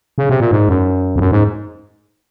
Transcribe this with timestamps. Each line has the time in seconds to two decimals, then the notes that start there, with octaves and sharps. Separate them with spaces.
0.18 C#3
0.29 C3
0.40 A#2
0.51 G#2
0.69 F#2
1.16 F2
1.20 F#2
1.32 G#2